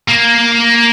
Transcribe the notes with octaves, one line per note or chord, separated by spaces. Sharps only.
A#3